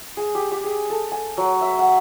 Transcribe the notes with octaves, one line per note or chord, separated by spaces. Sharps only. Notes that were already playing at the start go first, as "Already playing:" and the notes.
G#4
G4
G4
G#4
A4
G#5
F#3
E5
F#5